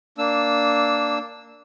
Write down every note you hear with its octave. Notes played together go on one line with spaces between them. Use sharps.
A#3 D4 E6